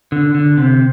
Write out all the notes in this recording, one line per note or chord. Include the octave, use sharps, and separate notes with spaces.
D3
D3
C3